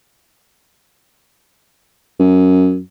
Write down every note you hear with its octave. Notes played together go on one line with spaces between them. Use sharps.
F#2